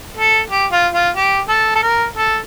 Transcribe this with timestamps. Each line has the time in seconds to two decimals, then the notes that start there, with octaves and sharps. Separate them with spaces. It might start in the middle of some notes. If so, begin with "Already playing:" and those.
0.17 A4
0.50 G4
0.72 F4
0.94 F4
1.16 G4
1.49 A4
1.75 A4
1.83 A#4
2.16 A4